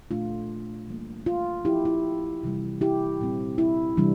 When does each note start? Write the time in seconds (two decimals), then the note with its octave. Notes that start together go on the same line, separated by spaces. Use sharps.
0.11 A#2 A3 D4 F4
0.88 E3 G3 A#3
1.26 F4
1.65 F3 C4 E4 G4
1.85 E4
2.43 C3 E3 G3
2.81 E4 G4
3.20 A#2 G3 C4
3.58 E4
3.97 C3 E3 G3 D4